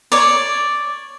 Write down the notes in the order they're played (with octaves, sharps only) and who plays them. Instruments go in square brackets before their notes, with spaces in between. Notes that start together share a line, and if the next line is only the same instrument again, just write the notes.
[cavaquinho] C#5 D5